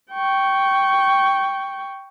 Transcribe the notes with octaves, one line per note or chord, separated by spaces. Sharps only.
G5 C#6